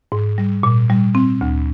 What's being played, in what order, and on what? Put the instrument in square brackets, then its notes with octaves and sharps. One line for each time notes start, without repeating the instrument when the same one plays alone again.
[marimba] G#2
G3
A#2
G3
C4
D2